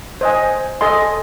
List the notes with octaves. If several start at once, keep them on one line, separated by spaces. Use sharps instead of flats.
C5 D#5 G#5
A4 D#5 G#5 C6